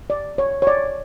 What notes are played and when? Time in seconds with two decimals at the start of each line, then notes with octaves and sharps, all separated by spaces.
0.10 D5
0.38 C#5
0.62 C#5
0.67 D5